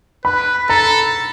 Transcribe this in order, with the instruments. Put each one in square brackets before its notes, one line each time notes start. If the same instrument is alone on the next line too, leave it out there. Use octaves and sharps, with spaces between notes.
[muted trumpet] B4 [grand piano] B5
[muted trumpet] A4 [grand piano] A#5